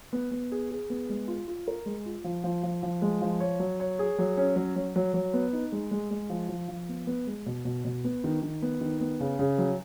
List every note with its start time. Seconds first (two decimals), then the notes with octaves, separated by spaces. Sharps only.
0.13 B3
0.31 B3
0.52 G#4
0.71 G#4
0.90 B3
1.09 G#3
1.28 F4
1.48 F4
1.68 A#4
1.86 G#3
2.06 F4
2.24 F3
2.44 F3
2.63 F3
2.83 F3
3.02 G#3
3.22 F3
3.40 C#5
3.60 F#3
3.80 C#5
3.99 G#4
4.18 F#3
4.37 C#4
4.56 F#3
4.76 F#3
4.96 F#3
5.14 F#3
5.34 B3
5.53 D#4
5.72 G#3
5.91 G#3
6.11 G#3
6.30 F3
6.49 F3
6.68 F3
6.89 B3
7.07 B3
7.27 G#3
7.46 B2
7.65 B2
7.85 B2
8.04 B3
8.24 D#3
8.42 D#3
8.62 B3
8.81 D#3
9.01 B3
9.20 C#3
9.39 C#3
9.58 F#3